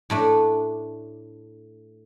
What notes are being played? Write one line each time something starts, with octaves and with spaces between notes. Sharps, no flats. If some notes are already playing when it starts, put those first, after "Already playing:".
A2 A3 D4